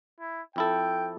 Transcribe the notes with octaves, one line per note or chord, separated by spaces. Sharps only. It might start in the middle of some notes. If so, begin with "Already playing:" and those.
E4
F2 E4 A4 G5